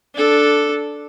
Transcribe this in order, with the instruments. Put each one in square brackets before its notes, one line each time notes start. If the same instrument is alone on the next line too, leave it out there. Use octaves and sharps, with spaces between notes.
[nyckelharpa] D4 A4